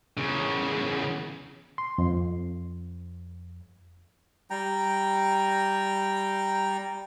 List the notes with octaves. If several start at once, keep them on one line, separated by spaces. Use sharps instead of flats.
E2 C#3
C6
F2
G3 G5 A#5